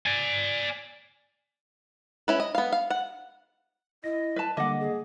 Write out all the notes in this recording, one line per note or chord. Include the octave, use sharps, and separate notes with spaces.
D5 G#5
C#4 E4 B4
D#5
B3 F5
F5
F#5
E4 D#5 A#6
B4 A5
D3 G3 A#3 D#5 F#5 D6
G#4